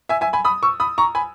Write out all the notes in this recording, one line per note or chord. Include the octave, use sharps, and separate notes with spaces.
E5 G#5
E5 G#5
G#5 B5
B5 D#6
C#6 E6
B5 D#6
A#5 C#6
G#5 B5